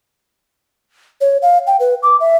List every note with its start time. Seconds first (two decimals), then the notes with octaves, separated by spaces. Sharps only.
1.21 C#5
1.42 F5
1.67 G5
1.80 B4
2.03 D6
2.20 E5